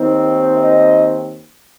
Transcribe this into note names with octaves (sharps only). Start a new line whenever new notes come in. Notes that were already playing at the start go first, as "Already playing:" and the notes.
Already playing: D#2 D#3 C4 D#4
D#5